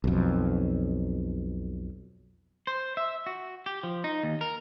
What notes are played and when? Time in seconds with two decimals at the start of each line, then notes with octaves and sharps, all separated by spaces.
0.04 B1 F2
2.67 C5
2.97 E5
3.26 F#4
3.66 G4
3.83 F3
4.04 D#4
4.23 D#2
4.41 A#4